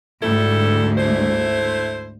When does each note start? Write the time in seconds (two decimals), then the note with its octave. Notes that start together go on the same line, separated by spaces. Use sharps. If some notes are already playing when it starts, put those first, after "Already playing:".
0.22 D2 G#2 G3 E4 A4
0.98 A3 E4 C5